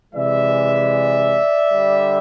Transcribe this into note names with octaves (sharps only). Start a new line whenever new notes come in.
C3 E3 G#3 D5 E5
D3 G3